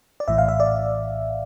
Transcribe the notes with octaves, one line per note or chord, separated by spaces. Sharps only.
D5
A#1 A2 E3 E5
F5
E5
D5